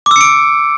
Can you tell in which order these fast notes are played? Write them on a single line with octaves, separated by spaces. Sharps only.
D6 E6 C#7 D7